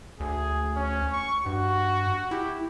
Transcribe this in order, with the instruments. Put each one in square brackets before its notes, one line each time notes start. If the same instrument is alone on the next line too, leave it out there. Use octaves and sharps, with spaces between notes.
[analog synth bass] D2 [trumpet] G#4
[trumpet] C#4
C#6
[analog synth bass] G2 [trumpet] F#4
[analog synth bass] E4 [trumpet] G4